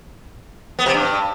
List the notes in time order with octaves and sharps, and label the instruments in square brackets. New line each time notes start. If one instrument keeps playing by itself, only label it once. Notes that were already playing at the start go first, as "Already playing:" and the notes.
[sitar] B3
C3
G2